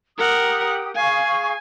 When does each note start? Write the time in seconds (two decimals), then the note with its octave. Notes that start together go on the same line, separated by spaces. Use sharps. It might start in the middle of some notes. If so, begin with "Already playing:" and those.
0.18 G4 A#4 F#5 D#6
0.95 G#4 F5 G#5 C#6